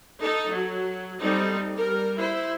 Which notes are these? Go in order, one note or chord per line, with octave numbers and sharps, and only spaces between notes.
D#4 A4
F#3
G3 C4 D#4 A4
G3 A#4
E4 C5